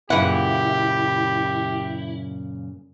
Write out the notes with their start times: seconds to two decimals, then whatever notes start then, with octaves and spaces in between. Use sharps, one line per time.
0.10 F#2 A#2 C#3 E3 E4 G4 F#5